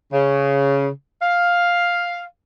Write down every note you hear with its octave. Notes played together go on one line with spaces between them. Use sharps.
C#3
F5